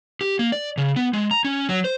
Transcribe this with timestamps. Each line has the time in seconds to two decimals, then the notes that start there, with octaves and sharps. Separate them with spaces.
0.21 G4
0.39 A#3
0.52 D5
0.77 C#3
0.96 B3
1.13 G#3
1.31 A#5
1.45 C#4
1.69 F#3
1.84 C5